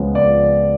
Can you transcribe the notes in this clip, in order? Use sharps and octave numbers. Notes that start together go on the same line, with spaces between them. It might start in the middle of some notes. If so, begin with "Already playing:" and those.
Already playing: C#2 C#3 F3 G#3 B3
C#2 D5